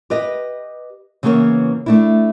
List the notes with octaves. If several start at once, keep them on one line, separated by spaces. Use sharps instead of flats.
G4 B4 D#5
C#3 E3 A#3 B3 B4 C#5
A3 D4 E4